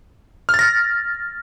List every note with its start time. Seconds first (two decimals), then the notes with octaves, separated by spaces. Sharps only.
0.49 F6
0.54 A6
0.59 A#6